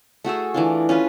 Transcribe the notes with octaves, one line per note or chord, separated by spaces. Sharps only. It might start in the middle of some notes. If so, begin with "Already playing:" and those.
A3 F#4 G#4 A4
E3 D4 F4
C#4 F4 B4